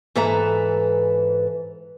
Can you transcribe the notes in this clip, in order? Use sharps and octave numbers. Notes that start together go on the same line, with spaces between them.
G#2 E3 A4 B4 E5 A#5